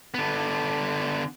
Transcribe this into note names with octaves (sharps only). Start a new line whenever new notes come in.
D3 B3